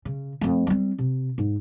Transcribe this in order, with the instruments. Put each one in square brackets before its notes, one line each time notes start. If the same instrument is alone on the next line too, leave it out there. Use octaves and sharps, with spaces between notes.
[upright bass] C#3
F2 A3
G3 C4
C3
G#2